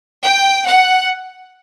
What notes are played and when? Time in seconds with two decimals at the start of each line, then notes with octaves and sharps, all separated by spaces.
0.23 G5
0.66 F#5